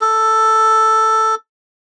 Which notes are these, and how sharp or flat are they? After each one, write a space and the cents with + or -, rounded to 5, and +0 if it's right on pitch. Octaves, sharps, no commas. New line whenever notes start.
A4 +5